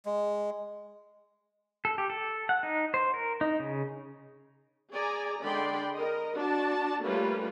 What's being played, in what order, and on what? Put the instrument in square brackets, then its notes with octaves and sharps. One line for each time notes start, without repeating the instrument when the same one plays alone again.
[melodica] G#3
[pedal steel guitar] A4
G4
A4
F#5
D#4
C5
A#4
D#4
C#3
[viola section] G#4 D5 G#5 A#5
D3 G#3 D5 G5 B5 C6
A#4 D#5
D4 F#4 A5
G3 A3 A#3 C#4 F4 B4